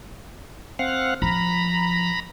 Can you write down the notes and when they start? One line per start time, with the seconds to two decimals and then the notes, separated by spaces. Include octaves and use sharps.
0.79 C4 F5 F#5
1.22 F3 A#5 B5